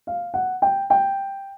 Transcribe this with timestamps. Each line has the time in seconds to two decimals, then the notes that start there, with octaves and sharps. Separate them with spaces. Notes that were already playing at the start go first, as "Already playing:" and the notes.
0.07 F5
0.34 F#5
0.62 G5
0.90 G5